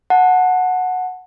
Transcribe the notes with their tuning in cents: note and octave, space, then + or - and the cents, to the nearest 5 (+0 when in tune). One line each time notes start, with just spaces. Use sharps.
F#5 -10 A5 +0